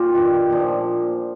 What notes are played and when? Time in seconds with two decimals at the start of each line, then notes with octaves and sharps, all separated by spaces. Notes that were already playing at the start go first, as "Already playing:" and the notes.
Already playing: A#2 F4 G4 F5
0.14 G2 D#3
0.50 A#2 F3